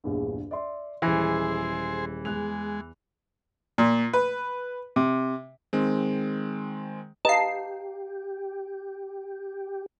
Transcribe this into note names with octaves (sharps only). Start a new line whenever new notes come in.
A#1 E2 G2
D5 E5 C6
D#1 E3 G#3 G#4 C5 A#6
E2 G#3 F#6 F7
A#2
B4
C3
D#3 G#3 C4
G4 B4 D#5 F5 A5 A#5 C7